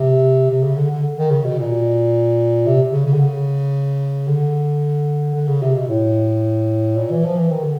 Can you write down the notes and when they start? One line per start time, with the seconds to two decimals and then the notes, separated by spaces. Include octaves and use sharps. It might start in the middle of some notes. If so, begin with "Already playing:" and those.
Already playing: C3
0.50 C3
0.63 C#3
0.77 D3
0.91 D3
1.18 D#3
1.31 C#3
1.44 B2
1.59 A#2
2.66 C3
2.93 C#3
3.06 C#3
3.13 D3
3.20 C#3
4.28 D3
5.34 D3
5.48 C#3
5.63 C3
5.76 B2
5.89 A2
6.97 A#2
7.10 E3
7.24 F3
7.37 E3
7.50 D#3
7.63 D3